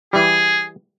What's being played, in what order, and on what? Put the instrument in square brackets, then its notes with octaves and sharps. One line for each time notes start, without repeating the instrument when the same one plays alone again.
[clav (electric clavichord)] E3 G3 [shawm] G#4